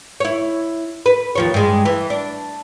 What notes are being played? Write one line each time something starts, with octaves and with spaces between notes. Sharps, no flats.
E4 C#5
B4
D#2 F3 C#5
G2 G#3
E3
D4